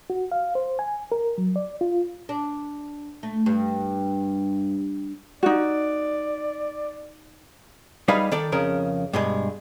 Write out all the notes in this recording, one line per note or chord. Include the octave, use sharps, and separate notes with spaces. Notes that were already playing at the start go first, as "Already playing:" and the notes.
F#4
F5
C5
G#5
A#4
F#3
D5
F4
D4
A3
G2
D#4 F#4 D5
G3 D#4 G#4 B4 F5
D#3 A4 D5
F2 C#3 A#4
G2 B2 G#3